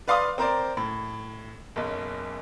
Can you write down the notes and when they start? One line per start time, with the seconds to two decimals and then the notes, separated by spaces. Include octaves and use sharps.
0.08 B4 D5 F5 C6 D#6
0.38 C4 A#4 C5 D5
0.77 A2
1.76 F#1 B1